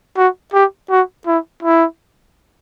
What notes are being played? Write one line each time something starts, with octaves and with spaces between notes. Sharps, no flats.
F#4
G4
F#4
E4
E4